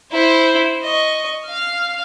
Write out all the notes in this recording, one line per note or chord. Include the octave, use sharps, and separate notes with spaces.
E4 C5
D#5 C#6
F5 F6